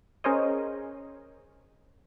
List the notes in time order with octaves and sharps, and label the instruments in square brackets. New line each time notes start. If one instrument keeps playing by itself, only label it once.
[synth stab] C#4 G#4 A#4 C5 C#5 D#5